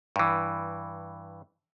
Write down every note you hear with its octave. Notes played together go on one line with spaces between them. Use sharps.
G2 E3